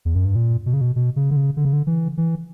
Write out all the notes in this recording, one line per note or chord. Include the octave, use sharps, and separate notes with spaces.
E2
F#2
G2
A#2
B2
C#3
B2
B2
C#3
D3
C#3
D3
C#3
D3
E3
E3